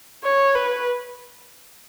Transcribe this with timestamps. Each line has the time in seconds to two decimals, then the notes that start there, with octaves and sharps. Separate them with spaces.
0.24 C#5
0.55 B4